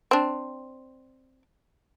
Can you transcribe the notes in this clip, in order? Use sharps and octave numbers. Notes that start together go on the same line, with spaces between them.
C4 D4